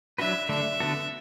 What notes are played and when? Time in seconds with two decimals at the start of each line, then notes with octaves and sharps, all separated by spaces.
0.18 F#3 D4 F#4 B4 E5
0.49 D3 A3 D4 E5
0.80 D3 B3 F#4 A4